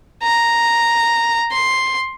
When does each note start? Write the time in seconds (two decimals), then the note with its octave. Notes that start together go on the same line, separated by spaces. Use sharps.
0.23 A#5
1.52 C6